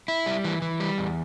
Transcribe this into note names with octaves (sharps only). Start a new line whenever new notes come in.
E4
G3
E3
E3
G3
E2